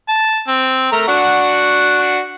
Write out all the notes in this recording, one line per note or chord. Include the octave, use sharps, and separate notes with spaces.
A5
C4
A3 A#4 A#5
D4 F#4 F#5